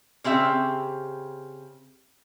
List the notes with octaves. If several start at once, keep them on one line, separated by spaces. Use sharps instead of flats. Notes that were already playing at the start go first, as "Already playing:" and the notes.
C#3 C4 G4 E5